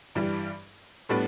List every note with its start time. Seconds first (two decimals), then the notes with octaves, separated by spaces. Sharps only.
0.15 G2 E3 G3
1.09 A2 G3 B3 D4